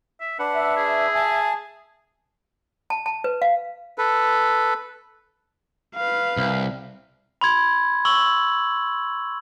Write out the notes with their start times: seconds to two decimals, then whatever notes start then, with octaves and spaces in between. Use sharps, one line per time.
0.20 E5
0.39 D4 B4 F#5
0.54 E5
0.77 G#4
1.15 G#5 A5
2.90 A5
3.06 A5
3.24 B4
3.42 F5
3.98 A4 B4
5.95 B4 F5
6.37 C2
7.41 B5 C6 G#6
8.05 C#6 E6 F#7